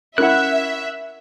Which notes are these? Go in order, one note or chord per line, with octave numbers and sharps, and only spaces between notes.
C#4 E4 A#4 E5 F#5 F#6